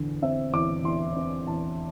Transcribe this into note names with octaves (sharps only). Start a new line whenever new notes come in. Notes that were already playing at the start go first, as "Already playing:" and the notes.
Already playing: E2 D3
C4 E5
E2 D6
E2 C6
C4
E2 A5